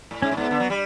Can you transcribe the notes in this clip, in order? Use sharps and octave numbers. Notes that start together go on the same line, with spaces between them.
A2
G#2 C#4
A2
G#2 B3
D3
F#3
G3